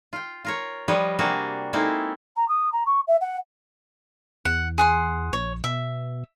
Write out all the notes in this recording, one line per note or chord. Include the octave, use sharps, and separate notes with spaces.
F4 G5
F4 A#4 C#5
F3 G3 B4 C#5 D#5
C3 G3 A#3 D4 F#4 G#4
G#3 A#3 C4 D#4 E4 A4
A#5
D#6
A#5
C#6
E5
F#5
E2 F#5
G#4 F#5 C6
A#1 C#5
B2 E5